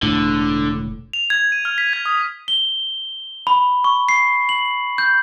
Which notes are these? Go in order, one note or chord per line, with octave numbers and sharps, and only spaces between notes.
E1 A2 D3
F7
G#6
D#7
F6
B6
G#6
D#6
G7
B5
C#6
C7
F#7
G6